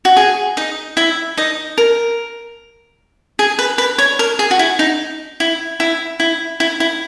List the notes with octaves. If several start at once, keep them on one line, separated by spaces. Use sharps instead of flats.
F#4
G#4
D#4 D#5
E4 E5
D#4 D#5
A#4
G#4
B4
B4
C#5
A#4
G#4
F#4
E4
D#4
E4
E4
E4
E4
E4